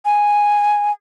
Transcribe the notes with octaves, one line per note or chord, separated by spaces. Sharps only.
G#5